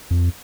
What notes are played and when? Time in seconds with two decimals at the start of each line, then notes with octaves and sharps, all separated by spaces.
0.11 F2